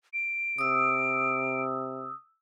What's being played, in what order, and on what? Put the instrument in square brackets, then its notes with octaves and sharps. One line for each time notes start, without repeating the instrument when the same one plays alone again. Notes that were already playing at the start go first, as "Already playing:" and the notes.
[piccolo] D7
[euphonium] C3 [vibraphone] D#6 E6